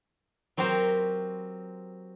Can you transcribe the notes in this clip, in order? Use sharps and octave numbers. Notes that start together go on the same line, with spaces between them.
F#3 C4 G4 A#4 C5